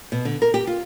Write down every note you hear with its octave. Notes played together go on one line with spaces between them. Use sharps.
B2
D3
A#4
G4
F4